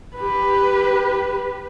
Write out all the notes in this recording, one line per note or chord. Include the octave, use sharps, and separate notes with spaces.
G4 B4